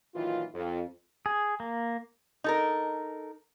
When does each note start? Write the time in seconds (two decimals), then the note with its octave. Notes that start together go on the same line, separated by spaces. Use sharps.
0.14 A#2 D#3 E3 F#3 F4
0.53 F2
1.26 G#4
1.60 A#3
2.44 D#4 A4 A#4